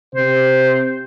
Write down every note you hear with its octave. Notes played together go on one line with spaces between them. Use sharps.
C3 C5